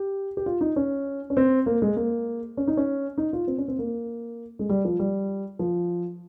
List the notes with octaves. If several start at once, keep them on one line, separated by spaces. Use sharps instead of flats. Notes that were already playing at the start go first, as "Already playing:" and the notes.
Already playing: G4
G4
F4
D#4
C#4
C#4
C4
A#3
G#3
A#3
C#4
D#4
C#4
D#4
F4
C4
C#4
C4
A#3
G#3
G3
F3
G3
F3